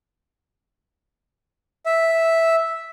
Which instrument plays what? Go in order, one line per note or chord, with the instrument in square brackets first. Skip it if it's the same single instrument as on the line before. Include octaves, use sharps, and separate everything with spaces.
[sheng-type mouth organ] E5